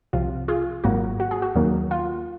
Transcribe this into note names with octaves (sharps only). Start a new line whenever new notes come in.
C2 C3 F3 F4
F4 G#4
G#1 G#2 F#3 A#3 F#4
F#4
G#4
F#4
D#2 D#3 F#3 A#3
F4